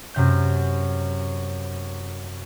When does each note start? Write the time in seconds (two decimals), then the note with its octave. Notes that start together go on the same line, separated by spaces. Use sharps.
0.14 F#2 C3 G6